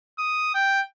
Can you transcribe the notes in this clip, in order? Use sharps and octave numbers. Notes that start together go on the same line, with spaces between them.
D#6
G5